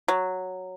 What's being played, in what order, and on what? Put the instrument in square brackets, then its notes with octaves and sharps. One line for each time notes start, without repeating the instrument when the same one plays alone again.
[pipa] F#3